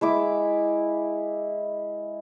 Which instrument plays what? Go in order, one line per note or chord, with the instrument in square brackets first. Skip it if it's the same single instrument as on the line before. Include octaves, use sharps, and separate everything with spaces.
[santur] G#3 E4 D6